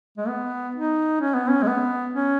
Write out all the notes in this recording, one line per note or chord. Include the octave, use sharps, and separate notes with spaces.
G#3
B3
D#4
C#4
B3
C#4
G#3
B3
C#4